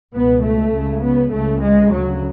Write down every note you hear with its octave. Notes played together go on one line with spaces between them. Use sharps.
C#2 B2 B3
A3
C#2 C#3
B3
C#2 C#3 A3
G#3
D2 C#3 F#3